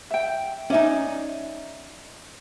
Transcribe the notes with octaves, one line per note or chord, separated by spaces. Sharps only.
E5 G5
C#4 D#4 D5 E5 G#5